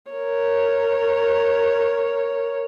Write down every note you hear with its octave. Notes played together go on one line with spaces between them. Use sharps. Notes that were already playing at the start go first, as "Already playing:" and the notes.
A#4 C#5